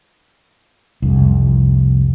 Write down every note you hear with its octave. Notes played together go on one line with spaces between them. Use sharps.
C2 F2